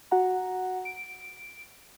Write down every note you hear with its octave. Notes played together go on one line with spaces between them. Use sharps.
F#4 F#5 A#5
D7